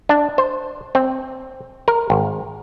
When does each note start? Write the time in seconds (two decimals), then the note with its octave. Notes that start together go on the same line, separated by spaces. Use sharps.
0.09 D4
0.38 C5
0.95 C4
1.88 A#4
2.10 G#1